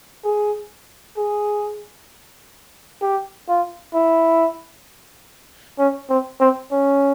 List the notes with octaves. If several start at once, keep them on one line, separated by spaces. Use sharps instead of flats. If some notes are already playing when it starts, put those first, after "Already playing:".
G#4
G#4
G4
F4
E4
C#4
C4
C4
C#4